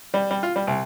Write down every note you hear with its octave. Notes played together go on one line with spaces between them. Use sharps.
G3
G3
F4
G3
C2